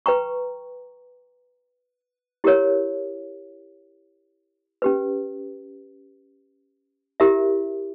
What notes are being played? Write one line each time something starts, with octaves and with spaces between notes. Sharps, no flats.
B4 G5 A#5 C#6
E4 G4 A#4 C#5
C#4 G4 B4
E4 G4 A#4 E5